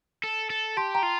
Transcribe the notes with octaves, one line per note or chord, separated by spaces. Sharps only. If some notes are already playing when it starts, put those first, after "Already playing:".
A4
A4
G4 A5 C6
G5 A#5
F4